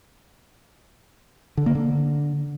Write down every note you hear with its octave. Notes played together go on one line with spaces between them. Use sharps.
D3
A#3
D3